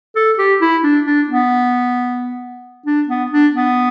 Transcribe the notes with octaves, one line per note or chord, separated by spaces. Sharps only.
A4
G4
E4
D4
D4
B3
D4
B3
D4
B3